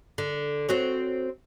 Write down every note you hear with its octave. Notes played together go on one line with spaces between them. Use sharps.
D3
C4 F#4 C#5